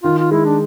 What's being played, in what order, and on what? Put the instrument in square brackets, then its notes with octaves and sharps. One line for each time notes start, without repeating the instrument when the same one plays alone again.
[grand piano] D#3 [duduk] F4
[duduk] F4
[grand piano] G#3 [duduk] E4
[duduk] D4